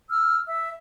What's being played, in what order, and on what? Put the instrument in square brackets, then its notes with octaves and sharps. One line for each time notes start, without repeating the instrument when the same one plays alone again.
[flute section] E6 F6
E5 E6